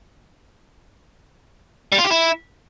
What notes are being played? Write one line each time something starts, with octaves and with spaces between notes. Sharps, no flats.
G3
F4
G4
E4